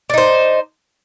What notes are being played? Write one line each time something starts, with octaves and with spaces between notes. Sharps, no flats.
D4 D#4 C5